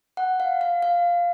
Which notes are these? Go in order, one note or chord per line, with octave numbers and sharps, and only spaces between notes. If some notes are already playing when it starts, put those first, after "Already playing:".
F#5
F5
F5
F5